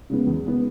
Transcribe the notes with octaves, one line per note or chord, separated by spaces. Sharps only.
C#3 G#3 B3
E2
C#3 G#3 B3